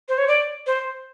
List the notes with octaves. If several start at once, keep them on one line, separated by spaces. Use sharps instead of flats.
C5
C#5
D5
C5